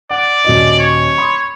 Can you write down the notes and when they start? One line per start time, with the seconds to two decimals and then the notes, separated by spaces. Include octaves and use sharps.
0.11 D5 F#5
0.44 D#1 F#4 D#5
0.79 C#5
1.18 B5 C6 D#6